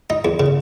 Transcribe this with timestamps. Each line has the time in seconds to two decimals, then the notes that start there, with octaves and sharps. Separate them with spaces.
0.10 D#4
0.25 E2
0.40 C#3